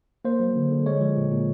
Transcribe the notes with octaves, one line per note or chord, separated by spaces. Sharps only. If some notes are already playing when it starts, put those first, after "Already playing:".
A#3 C5
F#3
D3
D3
G#3 C#5
F3
A#2
A#2